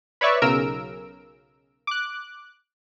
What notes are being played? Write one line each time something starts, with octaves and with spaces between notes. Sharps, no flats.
B4 C#5 D5 E5 C#6
B1 C#3 A#4 E6 D7
D6 F#6